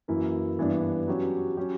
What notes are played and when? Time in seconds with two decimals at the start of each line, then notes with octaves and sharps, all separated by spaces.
0.08 F#2 E3 A#3 E4 A#4
0.59 G2 E3 B3 D4
1.07 F#3 C#4 G4
1.57 F#3 C#4 G4